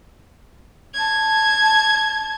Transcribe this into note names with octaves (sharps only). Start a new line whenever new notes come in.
A5 G#6